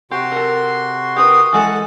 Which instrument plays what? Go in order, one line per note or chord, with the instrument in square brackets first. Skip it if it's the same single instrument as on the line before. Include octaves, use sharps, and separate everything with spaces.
[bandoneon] C3 F#4 C6 [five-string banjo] G4
[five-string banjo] A4 A#4
[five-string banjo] G4 A#4 B4 [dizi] D#6
[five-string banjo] E3 G#3 A4 [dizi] F#5